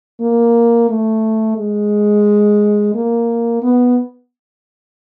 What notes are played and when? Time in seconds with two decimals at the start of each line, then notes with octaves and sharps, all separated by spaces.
0.21 A#3
0.89 A3
1.57 G#3
2.94 A#3
3.62 B3